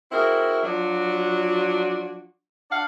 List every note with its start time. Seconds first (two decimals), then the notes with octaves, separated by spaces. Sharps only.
0.12 C4 E4 F#4 G#4 A#4
0.64 F3 F#3 D4 F4 F#4
2.71 D4 D5 F5 F#5